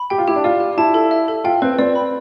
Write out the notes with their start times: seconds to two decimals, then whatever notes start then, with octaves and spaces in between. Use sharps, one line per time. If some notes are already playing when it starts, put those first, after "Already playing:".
Already playing: B5
0.10 G4 G5
0.18 F4
0.28 E4 G4
0.36 D4
0.44 F4 D5
0.60 G4
0.77 E4 A5
0.94 A4
1.11 E5
1.28 A4
1.44 F4 G5
1.62 C4 B4
1.79 C4 D5
1.95 B5